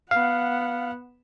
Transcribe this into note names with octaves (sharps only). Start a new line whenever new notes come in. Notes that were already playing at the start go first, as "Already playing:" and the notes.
B3 F5 F#5